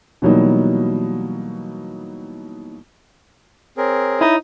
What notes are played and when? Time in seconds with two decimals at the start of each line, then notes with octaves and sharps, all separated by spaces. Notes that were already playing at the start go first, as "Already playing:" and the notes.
0.22 B2 E3 F#3 G3 A#3 D#4
3.77 C4 G#4 A#4 C#5
4.21 D#4 E4